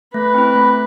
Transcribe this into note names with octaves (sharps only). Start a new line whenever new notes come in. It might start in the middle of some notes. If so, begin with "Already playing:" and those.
A3 B4
C4 E4
A3